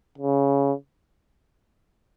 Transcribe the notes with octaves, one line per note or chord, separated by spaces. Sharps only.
C#3